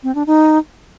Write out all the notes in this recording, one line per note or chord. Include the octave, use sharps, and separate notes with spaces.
C4
D4
D#4